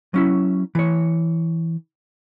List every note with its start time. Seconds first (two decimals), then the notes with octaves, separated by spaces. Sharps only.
0.14 F#3 C#4 E4
0.75 E3 C#5